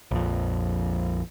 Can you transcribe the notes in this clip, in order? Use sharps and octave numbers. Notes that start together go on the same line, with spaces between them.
A#1 F2